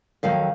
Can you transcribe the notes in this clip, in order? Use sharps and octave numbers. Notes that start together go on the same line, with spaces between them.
F2 D#3 F#3 F5